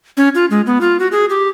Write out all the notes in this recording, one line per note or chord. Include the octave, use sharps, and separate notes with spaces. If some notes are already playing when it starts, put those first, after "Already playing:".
C#4
F4
G#3
B3
F4
F#4
G#4
G4